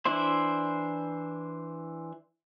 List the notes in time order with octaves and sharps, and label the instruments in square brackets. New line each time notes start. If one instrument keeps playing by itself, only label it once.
[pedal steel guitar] E3 D4 E4 C5